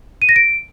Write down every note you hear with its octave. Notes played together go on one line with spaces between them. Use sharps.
D#7
A#6
D7